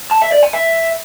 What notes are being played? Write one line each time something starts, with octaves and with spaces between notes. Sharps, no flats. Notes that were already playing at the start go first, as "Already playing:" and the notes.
A5
E5
D5
G#5
E5